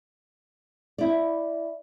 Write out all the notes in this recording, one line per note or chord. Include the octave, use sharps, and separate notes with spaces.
E4 D5